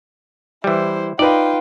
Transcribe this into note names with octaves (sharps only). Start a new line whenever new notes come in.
E3 G3 E4 C5
D#4 F4 B4 D5 G5